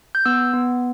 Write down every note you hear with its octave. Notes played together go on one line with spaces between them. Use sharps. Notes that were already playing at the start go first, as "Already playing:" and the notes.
G6
B3 E6
B3